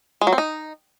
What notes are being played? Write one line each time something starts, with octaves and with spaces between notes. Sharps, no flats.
G#3
F#3
C4
D#4